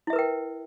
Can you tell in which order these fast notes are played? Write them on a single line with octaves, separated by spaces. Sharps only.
E4 E5 B4 A#4 G5